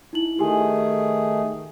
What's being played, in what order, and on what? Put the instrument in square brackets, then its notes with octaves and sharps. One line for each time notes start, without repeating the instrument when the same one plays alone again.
[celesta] D#4 E4 F#7
[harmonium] D#3 A3 G#4 [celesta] G4 G#5